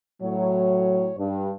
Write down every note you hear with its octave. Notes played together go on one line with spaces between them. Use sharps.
A2 F#3 C#5
G2